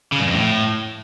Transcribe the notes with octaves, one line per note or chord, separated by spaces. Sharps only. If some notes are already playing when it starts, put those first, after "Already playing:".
C#3
G2
F2
A2